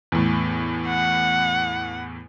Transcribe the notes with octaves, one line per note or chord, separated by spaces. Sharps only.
E2 A2
F#5